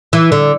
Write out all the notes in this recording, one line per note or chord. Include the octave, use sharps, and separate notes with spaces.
E3
D3